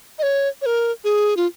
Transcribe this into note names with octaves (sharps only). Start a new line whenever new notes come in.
D#5
C#5
C#5
A#4
G#4
F4